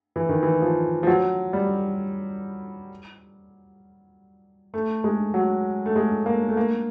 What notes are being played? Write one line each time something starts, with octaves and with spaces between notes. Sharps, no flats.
E3
D#3
E3
F3
F3
F#3
G3
A3
G#3
F#3
A3
G#3
A#3
A3
A#3